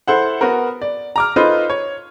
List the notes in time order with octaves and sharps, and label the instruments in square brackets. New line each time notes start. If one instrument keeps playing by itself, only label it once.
[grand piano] E4 A4 C5 F#5
B3 F#4 A#4
D5
A#5 D6 F6
D#4 F4 A4 B4 C5
C#5